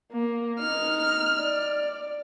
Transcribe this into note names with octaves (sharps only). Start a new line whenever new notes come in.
A#3
D#4 F6
D5